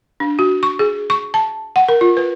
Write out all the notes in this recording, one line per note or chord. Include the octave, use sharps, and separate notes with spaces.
D4
F#4
C#6
G#4
C#6
A5
F#5
A#4
F4
B4